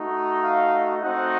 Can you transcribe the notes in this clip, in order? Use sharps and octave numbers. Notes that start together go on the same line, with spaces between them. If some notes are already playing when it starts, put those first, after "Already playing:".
Already playing: A3 D#4 F#4
F5
A3 C4 D#4 F#4 F#5